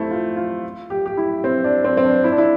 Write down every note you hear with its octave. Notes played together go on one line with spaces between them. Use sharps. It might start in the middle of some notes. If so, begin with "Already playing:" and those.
Already playing: A3 C4 E4
F4
F4
G4
G4
E4
C4
D4
C4
C4
D4
E4
D4
E4